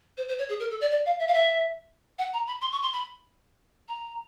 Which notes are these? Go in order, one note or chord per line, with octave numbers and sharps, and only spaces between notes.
C5
C5
C#5
G#4
A#4
A4
D5
D5
F5
E5
F5
E5
F#5
A#5
B5
C6
C#6
C6
B5
A#5